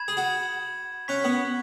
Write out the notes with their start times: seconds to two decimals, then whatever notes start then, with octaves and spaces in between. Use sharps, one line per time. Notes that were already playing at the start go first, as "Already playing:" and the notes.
Already playing: B5 G#6 E7
0.08 G#4
0.17 F#4
1.08 C#4 C#6 F#6 B6
1.24 B3